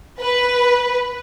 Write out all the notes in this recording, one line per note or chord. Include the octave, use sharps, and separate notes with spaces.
B4